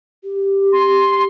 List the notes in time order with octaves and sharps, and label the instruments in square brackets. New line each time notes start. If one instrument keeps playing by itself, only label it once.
[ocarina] G4
[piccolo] C6